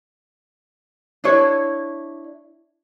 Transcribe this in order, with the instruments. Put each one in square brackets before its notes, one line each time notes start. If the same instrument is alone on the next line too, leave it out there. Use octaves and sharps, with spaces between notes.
[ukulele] D4 E4 C#5